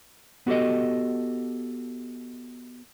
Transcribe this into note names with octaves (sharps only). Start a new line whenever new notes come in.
B3 F#4 G4 A4 D#5